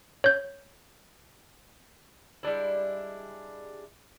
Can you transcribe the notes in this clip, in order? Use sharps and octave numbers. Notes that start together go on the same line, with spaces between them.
C#5 G6
G3 G#3 D4 E4